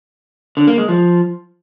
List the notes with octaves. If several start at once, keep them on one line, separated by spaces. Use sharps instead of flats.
D3
A#3
G#3
F3